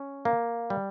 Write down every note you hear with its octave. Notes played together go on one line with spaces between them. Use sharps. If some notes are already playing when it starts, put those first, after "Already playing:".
Already playing: C#4
A#3
G3